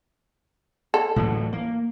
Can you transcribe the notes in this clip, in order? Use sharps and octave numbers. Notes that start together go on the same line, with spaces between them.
A4
A2 E3 F#3
A#3